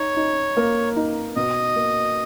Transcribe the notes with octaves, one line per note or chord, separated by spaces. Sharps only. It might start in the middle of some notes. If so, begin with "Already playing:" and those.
Already playing: D#4 C#5
D#4
A#3
D#4
B2 D#5
A#3